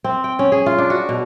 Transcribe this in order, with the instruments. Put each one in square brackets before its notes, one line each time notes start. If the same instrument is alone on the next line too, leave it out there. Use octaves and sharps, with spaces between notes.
[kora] C4
G5
C#4
G#4
F4
D4
F#4
B2